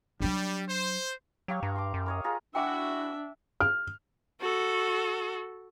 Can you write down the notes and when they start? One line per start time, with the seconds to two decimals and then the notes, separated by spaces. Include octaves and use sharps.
0.20 F#3 G3 D4
0.68 C5
1.48 F#3 G4 F5 C#6
1.63 G2 A#5
1.75 C6 D6
1.94 F#2
2.06 A#4 C#5 D#5
2.24 F4 G#4 A#4
2.55 D4 E4 F#4 E5 G5 G#5 D6
3.60 F6
4.41 F#4 A4